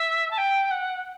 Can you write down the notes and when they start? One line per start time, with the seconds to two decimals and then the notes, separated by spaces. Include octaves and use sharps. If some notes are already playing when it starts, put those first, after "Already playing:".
Already playing: E5
0.30 A5
0.37 G5
0.70 F#5